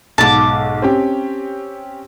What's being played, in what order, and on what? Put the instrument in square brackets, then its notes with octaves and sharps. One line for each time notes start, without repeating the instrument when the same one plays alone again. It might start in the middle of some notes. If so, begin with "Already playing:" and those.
[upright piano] B1 G#2 [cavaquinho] A5 D6
[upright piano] C4 C#4 G4